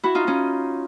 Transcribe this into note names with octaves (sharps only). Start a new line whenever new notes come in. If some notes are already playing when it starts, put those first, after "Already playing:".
E4 F#4
D#4 F4
C#4 D#4